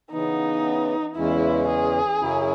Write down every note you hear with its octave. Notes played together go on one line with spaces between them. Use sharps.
C#3 E3 B3 D#4
E2 C#3 E3 G#3 C#4 E4
G#4
F#2 C#3 F#3 C#4 E4